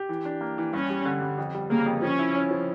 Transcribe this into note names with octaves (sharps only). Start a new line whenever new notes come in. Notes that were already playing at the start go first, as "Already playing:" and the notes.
Already playing: G4
E3
D4
A#3
E3
G2 C#4
G3
D3
G2
F2
G3
C#3 A#3
F2
F3 C#4
E4
C#4
F3